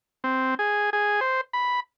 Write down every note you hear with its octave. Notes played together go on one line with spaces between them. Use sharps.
C4
G#4
G#4
C5
B5